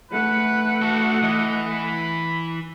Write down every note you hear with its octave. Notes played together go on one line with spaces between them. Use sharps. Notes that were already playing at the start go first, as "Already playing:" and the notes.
A3 B4 F#5
F#4 A4
E3 D#5
B5